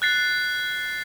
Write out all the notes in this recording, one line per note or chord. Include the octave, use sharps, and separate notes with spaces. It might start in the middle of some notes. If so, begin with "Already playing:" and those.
F#6 A6 C7